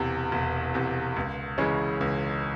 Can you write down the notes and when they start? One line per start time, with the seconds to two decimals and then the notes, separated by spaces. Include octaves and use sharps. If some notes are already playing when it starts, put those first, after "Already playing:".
Already playing: E1 E2 C3
0.32 E1
0.74 E2 C3
1.16 C#2
1.58 C#3 E3 G#3 C#4
2.01 C#2